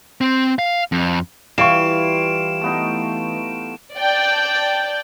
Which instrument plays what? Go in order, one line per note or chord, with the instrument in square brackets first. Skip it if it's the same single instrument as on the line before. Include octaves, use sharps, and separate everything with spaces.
[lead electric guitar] C4
F5
F2
[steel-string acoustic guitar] E3 [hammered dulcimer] G3 E4 F4 [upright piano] F5 C#6 [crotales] D7 E7
[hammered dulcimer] A3 B3 D#4
[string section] D5 G5 A5